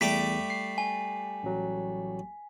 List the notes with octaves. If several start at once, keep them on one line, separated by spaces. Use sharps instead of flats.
E2 G3 A3 D6 B6
C7
G#5
A1 F#3